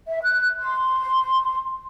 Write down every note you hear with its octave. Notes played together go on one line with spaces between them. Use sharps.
E5
F#6
C6